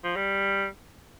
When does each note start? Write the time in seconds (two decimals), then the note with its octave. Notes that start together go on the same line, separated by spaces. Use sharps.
0.04 F3
0.16 G3